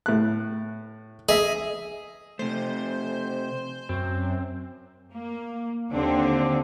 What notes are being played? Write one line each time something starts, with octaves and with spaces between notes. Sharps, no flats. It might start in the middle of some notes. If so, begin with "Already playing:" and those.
A2 F#6
G#4 D#5 E5
C3 A3 C5
F#2 C4
A#3
D#2 D3 C4 D4